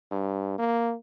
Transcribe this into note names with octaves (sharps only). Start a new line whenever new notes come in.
G2
A#3